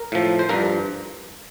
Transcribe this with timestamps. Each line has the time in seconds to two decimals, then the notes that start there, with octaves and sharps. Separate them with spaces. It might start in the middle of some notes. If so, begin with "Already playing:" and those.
Already playing: A#4
0.12 A2 F3
0.39 C5
0.49 G2 F3 A#4